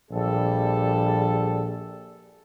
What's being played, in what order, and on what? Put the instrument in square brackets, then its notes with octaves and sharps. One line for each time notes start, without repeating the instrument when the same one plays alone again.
[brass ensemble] A#1 G3 G#4 A4